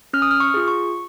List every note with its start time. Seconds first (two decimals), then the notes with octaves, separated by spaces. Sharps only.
0.13 C#4 F6
0.22 D#6
0.31 F6
0.40 C#6
0.54 F4 G#4
0.68 C#6